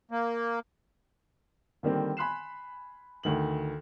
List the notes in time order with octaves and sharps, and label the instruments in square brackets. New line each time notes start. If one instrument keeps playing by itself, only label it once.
[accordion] A#3
[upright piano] D3 D#3 G3 A#3 C4
G#5 B5 C6 F#6 C7 E7
D2 D#3 F#7